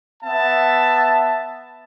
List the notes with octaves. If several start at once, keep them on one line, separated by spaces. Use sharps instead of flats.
B3 E5 A5